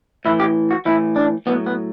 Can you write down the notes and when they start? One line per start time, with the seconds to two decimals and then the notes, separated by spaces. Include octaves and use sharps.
0.25 A2 E3 E4
0.40 G4
0.71 F#4
0.85 A2 E3 E4
1.16 D4
1.46 A2 F#3 B3
1.66 B3